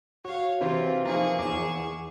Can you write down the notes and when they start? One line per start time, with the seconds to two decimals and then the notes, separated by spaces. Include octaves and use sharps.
0.25 F#4 C#5 F5
0.61 C3 E3 C4 F4
1.05 F3 A#3 D#4 G#4 C#6
1.39 E2 D6 E7